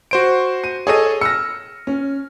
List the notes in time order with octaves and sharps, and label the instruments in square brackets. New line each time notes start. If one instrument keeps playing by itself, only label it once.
[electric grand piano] F#4 C5 D7
[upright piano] D#7
[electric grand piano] G#4 A4 D#5 [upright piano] C#5 D#7
[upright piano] E6 F6 A#6 [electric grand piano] C#7
[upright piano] C#4